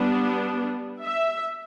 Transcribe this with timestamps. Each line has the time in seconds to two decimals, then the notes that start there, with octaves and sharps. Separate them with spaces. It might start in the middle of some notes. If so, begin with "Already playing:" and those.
Already playing: G3 B3 D4
1.03 E5